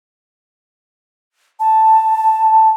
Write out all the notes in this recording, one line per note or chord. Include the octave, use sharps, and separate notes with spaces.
A5